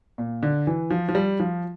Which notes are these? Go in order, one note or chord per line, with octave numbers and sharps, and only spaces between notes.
A#2
D3
E3
F3
F3
G3
F3